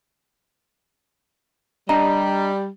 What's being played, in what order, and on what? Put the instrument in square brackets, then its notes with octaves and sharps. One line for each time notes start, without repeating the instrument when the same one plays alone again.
[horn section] G3 [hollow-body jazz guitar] D4 D#5 [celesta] A#5